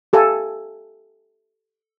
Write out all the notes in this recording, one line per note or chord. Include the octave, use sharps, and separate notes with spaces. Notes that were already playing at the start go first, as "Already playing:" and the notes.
G4 A4 F5 G#5